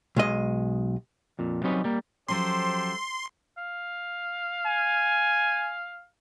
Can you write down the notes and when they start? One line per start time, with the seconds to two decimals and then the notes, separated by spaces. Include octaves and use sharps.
0.17 B1 G#3 D#5
1.39 F2 A#2
1.63 F#3 G3 C4 C#4 D#4 B4
1.84 G3 A#3
2.28 F3 F#3 C#4 G4 A4 C5 C6
3.58 F5
4.66 G#5